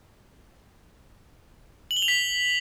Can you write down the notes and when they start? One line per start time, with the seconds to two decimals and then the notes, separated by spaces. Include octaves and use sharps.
1.91 F#7
1.97 G7
2.02 F7
2.08 B6